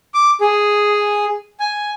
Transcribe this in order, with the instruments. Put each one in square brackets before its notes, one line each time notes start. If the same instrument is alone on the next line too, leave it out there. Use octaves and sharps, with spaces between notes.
[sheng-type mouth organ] D6
G#4
G#5